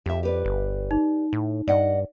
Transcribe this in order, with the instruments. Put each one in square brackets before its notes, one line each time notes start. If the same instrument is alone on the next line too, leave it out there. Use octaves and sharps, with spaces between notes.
[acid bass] F2 [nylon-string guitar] G4 E5
[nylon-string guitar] G4 B4 D5
[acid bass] G1
[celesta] D#4
[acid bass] A2
[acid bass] G2 [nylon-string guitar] D5 D#5 F#5